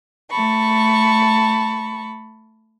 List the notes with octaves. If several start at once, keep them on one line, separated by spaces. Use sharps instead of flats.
A3 A5 B5 C#6